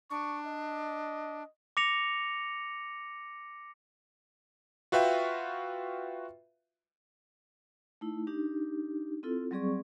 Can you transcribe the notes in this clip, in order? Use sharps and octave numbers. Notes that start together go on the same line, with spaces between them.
D4 C#6
D#5
D6 A#6 C#7 F7
F4 F#4 B4 E5 F5 G5
A3 D#4 E4
D4 D#4 G4
C4 E4 F4 A4
F#3 G3 C4 G#4 D5 C#6